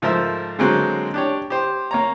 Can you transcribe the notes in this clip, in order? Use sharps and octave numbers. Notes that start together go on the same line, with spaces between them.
G#2 F3 A3 A#4 C5 E5
D3 F#3 G#3 A#3 C4 F#4
D4 G4 C#5
G4 C5
A#3 C#5 A#5